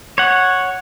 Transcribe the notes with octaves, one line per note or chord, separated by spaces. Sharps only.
C#5 F#5